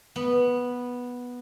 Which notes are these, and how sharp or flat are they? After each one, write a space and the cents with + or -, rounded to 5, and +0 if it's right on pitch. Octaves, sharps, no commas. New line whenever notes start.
B3 -5